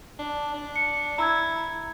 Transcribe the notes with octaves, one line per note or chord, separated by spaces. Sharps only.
D4
D4
C#7
E4 A#5 E6 G#6